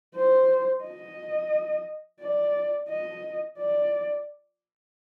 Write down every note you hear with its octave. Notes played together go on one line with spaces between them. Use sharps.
C5
D#5
D5
D#5
D5